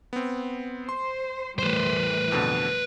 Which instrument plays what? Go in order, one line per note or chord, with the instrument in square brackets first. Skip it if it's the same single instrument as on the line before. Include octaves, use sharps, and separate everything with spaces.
[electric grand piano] B3 C4
[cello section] C5 [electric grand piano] C6
[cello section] A2 E3 G3 [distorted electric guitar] B4 C5
[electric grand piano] F2 B2 D3